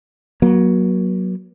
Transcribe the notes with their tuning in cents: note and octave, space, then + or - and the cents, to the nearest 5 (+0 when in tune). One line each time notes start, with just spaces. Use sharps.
F#3 +0 A#3 +40